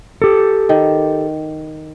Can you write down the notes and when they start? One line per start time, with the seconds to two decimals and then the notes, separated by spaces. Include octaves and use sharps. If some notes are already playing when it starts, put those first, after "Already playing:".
0.22 G4 A4
0.69 D#3